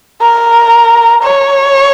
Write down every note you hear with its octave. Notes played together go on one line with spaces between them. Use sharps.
A#4
C#5